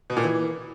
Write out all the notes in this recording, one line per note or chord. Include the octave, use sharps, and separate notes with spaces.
B2
A#2
E3